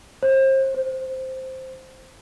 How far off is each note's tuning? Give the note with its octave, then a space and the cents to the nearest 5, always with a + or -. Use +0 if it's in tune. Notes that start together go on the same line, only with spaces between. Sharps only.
C5 +30
C5 +0